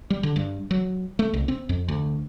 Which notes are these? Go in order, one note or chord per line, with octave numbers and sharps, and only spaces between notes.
G3
D3
G2
F#3
A3
C2
C4
F2
D2